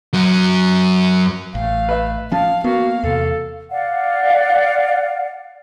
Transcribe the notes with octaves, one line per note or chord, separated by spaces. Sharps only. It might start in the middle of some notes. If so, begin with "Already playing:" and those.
F#2 F#3
A1 A3 F5
B4 E5
F3 C#4 F5 A5
A#3 B3 F#4 F5
E2 C3 A4
D5 F5 F#5